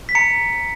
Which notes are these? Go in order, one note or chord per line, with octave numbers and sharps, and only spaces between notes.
B6
A#5 C#7